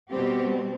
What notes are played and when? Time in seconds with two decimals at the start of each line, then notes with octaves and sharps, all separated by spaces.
0.10 B2 G3 C4 G4